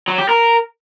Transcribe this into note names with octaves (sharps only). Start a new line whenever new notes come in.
F#3
G4
A#4